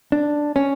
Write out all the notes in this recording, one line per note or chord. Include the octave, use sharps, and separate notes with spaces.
D4
C#4